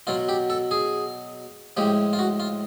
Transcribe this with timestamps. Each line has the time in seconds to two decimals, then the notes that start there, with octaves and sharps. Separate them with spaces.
0.07 B2 F#3 F4
0.29 G4
0.50 A4
0.71 G#4
1.77 A2 F3 G#3 G4
2.13 F4
2.19 F#4
2.40 F4